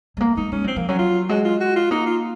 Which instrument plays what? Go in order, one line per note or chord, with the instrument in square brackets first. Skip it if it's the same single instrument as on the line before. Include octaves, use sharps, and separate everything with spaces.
[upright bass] G#3
A#3
[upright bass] G#3 [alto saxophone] D#4
[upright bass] G#3 [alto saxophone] C#4
[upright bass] F#3 [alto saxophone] C4
[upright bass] F3 [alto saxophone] A#3
[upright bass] F#3 [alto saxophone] C#4
[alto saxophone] F4
[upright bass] G#3 [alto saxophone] F#4
[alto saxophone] F4
F#4
F4
[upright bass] A#3 [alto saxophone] D#4
[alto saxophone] F4